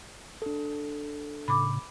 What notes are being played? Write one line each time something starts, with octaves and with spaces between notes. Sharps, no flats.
D4 A4
A2 C#3 B5 D6